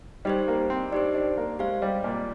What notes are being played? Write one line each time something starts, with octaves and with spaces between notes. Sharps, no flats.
G3 D#4 G4 C5
A#3
C4
D4 D#4 G4 C5
D4
A#3
G#3 G4 C5 F5
G3
A#2